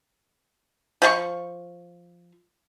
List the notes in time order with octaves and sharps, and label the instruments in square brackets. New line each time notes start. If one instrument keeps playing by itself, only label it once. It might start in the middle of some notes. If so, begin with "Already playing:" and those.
[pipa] F3 G4 C#6